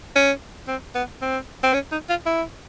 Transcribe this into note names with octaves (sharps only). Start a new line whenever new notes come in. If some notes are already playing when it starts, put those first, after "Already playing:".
C#4
C4
B3
C4
C4
C#4
D#4
F4
E4